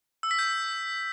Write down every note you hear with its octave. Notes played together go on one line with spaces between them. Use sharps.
E6
B6
G6